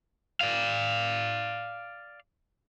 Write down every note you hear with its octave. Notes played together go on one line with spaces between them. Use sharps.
D5 F5